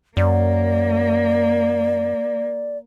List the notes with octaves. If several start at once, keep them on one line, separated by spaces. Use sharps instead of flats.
F#2 A#3 D5